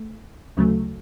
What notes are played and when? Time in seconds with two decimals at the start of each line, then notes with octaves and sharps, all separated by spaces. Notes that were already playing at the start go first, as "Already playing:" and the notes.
Already playing: A3
0.57 D2 C#3 F#3 A3